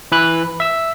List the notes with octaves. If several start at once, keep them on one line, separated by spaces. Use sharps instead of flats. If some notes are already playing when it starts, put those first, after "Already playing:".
E3 B4 F#6
E5 E6